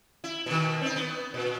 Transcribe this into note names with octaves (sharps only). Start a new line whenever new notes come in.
E4
B2 D#3
C4 D#4
B3
A#2